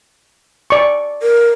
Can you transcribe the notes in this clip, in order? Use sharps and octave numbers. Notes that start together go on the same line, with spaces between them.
D5 C#6
A#4